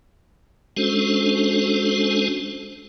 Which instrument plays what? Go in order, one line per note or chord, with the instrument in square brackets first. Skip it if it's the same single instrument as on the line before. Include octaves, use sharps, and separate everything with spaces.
[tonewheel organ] G#3 C#4 D4 F#4 A4 C5